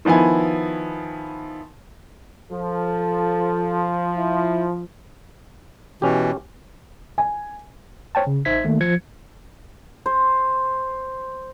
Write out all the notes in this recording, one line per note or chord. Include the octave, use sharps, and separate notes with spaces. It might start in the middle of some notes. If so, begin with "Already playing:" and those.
D#3 F3 B3 E4 G#5
F3 A4
E4
B2 E3 C#4 G4
G#5
C5 C#5 G5 A5
C#3
A1 D#4 C5 E5 G#6 B6
D#3 A3 A#3
F3 G#6 C#7
C5